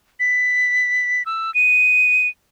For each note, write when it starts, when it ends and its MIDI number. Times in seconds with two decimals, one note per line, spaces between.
0.20 1.25 95
1.26 1.53 88
1.54 2.27 99